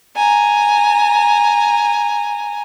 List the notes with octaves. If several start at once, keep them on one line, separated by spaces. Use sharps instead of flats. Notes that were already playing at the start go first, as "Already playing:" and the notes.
G#5 A#5